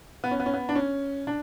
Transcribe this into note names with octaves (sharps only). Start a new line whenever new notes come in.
B3
C#4
B3
C#4
B3
D4
C#4
D4